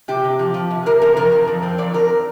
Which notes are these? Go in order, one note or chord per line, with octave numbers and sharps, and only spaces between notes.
C3 G4
C3
F3
F3
C3
C3 A#4
C3 A#4
F2 A#4
F2
F2
C4
F3 D5
F2 A#4